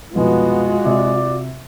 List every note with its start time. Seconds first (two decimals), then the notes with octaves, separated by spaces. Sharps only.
0.15 C2 F2 B2 G#3 B3 F4 F#4
0.85 C3 D5